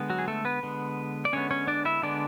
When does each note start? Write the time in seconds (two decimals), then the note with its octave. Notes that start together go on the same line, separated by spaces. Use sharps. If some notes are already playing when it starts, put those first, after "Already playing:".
Already playing: D3 G#3 B3
0.10 F#3 F#4
0.19 G#4
0.28 A3 A4
0.45 B3 B4
0.63 D3 G#3 B3
1.25 D5
1.33 D3 G#3 B3 C#4 C#5
1.51 C#4 C#5
1.68 D4 D5
1.85 E4 E5
2.03 D3 G#3 B3 D4 D5